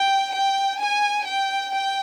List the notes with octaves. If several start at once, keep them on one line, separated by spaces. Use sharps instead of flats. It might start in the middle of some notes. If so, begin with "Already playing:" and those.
Already playing: G5
G5
G#5
G5
G5